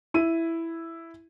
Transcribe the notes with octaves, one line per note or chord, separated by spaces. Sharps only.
E4 D#7